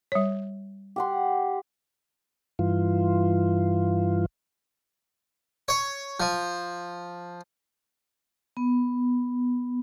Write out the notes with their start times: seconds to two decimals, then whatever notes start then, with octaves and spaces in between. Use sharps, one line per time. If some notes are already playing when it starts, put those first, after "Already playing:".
0.12 G3 C#5
0.96 G4 F#5 C6
2.59 G2 E3 F4
5.68 C#5
6.20 F3
8.57 B3